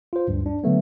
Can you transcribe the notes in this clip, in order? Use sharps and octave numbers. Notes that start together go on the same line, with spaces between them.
F4 C5
D2 G2
D4
D3 F#3 A3 B3